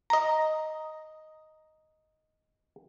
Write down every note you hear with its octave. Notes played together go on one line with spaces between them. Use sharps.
D#5 A#5